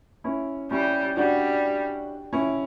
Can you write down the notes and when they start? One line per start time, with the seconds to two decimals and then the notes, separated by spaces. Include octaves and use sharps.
0.24 C#4 E4
0.71 G3 C#4 E4
1.17 G3 D4 F#4
2.33 C#4 E4